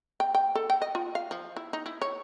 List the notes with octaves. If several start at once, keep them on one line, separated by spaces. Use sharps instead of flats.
G5
G5
A4
G5
D#5
F4
F5
F3
E4
D#4
E4
C#5